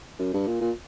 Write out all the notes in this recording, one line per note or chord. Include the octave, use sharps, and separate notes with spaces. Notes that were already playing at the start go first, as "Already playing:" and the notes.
F#2
G2
A#2
A#2